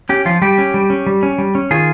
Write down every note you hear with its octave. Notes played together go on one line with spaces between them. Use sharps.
C#4 G4
F3 F4
G3 G4
C#4
G3
C#4
G3
C#4
G3
C#4
D#3 F4 G#4